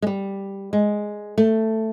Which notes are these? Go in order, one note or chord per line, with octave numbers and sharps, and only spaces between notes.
G#3
G3
G#3
A3